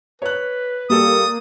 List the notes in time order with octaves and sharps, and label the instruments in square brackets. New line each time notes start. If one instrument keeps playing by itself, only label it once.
[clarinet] B4 [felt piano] C#5 F#6
[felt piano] G3 A4 [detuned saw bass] A#3 [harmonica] D#6